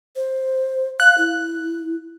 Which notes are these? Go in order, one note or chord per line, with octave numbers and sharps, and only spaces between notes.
C5
F5 F#6
E4